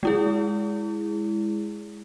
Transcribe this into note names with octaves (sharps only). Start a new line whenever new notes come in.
G#3 E4 G#4